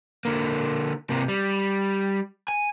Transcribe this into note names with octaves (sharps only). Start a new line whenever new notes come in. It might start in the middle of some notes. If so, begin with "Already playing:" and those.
D3 A#3
C3 A#3
G3
G#5